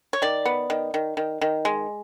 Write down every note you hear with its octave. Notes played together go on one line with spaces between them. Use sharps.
C#5
D#3 D5
B3
D#3
D#3
D#3
D#3
G#3